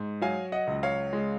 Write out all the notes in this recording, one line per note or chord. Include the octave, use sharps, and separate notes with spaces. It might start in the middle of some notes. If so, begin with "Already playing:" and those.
Already playing: G#2
F#3 F5 G#5
D#5 F#5
C#2
C#5 F5
G#3